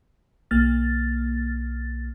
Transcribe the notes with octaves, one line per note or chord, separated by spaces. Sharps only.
B1 A#3 F6 A6